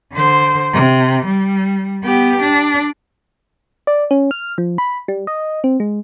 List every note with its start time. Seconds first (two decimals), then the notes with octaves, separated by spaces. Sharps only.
0.13 D3 C5
0.73 C3
1.26 G3
2.04 B3 G4
2.42 D4
3.87 D5
4.11 C#4
4.31 F6
4.58 F3
4.78 B5
5.08 G3
5.27 D#5
5.64 C4
5.80 G#3